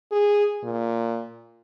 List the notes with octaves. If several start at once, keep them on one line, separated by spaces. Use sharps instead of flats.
G#4
A#2